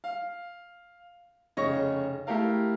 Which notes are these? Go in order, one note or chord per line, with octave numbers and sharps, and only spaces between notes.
F5
F1 C#3 C#5 D#5 C#6 A#6
A3 E4 G4 A#4 F5